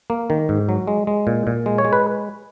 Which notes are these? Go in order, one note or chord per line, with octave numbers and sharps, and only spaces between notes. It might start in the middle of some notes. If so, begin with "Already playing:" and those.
A#3
D#3
G#2
F#3
G#3
G#3
A#2
A#2
G#3
C#5
G#3
B4